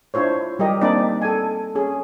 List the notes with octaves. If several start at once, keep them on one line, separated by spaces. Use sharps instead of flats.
D4 E4 F4 C5 C#5
G3 G4 A#4 D#5
A#3 C4 D4 D#4 D5
A4 G#5
C#4 G#4